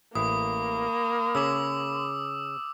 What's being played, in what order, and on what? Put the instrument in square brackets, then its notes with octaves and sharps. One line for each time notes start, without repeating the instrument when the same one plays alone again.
[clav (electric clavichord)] A1 E4 [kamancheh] A#3 [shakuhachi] B5 [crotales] D#6
[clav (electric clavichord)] C#3 C#4 [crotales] D6 E6